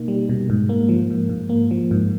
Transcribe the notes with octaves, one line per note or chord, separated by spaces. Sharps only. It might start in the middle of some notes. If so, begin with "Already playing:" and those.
Already playing: B2 A#3 D#4
G3
B2
G#2
A#3
F3
G#2
G#2
A#3
F3
G#2